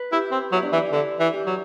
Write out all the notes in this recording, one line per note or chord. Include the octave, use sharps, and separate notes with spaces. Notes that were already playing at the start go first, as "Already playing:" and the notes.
Already playing: B4
E4 G4
C4
F#3 E4
D4
E3 E4
D3 E4
E3
G4
F#3